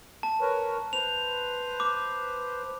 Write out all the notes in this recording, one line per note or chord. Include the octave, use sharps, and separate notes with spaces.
A5
A#4 B4 C#5
B4 C5 F7
D6